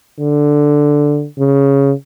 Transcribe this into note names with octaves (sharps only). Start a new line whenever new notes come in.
D3
C#3